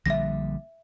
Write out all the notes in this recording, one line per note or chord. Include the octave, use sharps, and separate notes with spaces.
A#1 D3 G3 E5 A#6